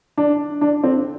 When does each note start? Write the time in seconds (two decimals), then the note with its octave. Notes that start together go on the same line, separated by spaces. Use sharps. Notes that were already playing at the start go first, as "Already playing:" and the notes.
0.18 D4
0.61 D4
0.83 C4